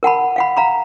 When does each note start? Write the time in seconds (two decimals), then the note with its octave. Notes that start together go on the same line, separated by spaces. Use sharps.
0.03 A#4 F#5 A5 B5
0.36 F5 F#5 B5
0.57 F5 A#5 B5